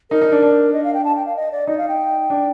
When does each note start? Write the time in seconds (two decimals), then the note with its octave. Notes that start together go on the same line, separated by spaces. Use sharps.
0.11 D#4 A#4
0.21 D#4
0.32 D4
0.42 D4
0.73 D#5
0.84 F5
0.94 G5
1.05 A5
1.15 G5
1.26 F5
1.36 D#5
1.52 D5
1.67 D#4 D#5
1.78 F5
1.88 G5
2.30 D4